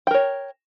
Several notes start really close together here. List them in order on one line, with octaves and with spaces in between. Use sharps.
G5 A#4 C#5